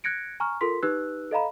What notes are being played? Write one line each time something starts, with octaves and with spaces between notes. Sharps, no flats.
F#6 G#6 A#6 C#7 D7
G#5 A#5 C#6 F6
F4 A4 A#4 C6 B6
D#4 G4 B4 E6 F#6
A4 D#5 F5 A#5 B5